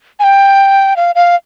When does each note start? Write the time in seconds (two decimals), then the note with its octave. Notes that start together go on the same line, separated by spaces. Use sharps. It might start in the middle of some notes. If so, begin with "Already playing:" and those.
0.20 G#5
0.24 G5
0.96 F5
1.15 F5